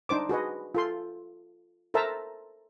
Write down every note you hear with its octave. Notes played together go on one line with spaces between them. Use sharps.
D4 D#4 C5 D6
F#4 G#4 B4 D#5
F4 A4 C6
A4 A#4 C5 E5 A5 A#5